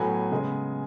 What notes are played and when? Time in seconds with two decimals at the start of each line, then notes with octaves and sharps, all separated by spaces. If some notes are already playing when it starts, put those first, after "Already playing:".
Already playing: A2 F#3 B3 G#5
0.31 C#3 G#3 B3